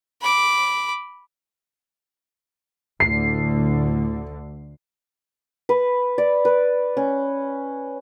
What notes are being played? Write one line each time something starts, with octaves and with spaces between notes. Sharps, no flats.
B5 D6
D2 A2 D3 C7
B4
D5
B4
C#4